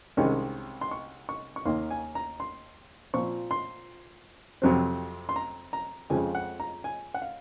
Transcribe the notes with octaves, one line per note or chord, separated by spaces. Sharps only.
C2 C3 D#3 G#3 C#4
C6
C#6
C#6
C#6
D#2 D#3 A#3 C6
G#5
A#5
C6
A#2 F3 C4 C#6
C6
F2 C3 F#3 C4
C6
A#5
A#5
F2 C#3 F3 G#3 G#5
F#5
A#5
G#5
F#5
F5